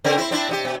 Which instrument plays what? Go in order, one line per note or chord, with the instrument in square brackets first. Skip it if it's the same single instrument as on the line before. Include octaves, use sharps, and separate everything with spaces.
[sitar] C#3 C4 A#4
C4 E4
C4 D4 E4
C3 D#4 G4
B2